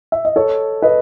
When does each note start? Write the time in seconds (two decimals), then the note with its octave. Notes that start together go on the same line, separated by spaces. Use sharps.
0.12 E5
0.25 D#5
0.36 A4 C#5
0.82 B4 D#5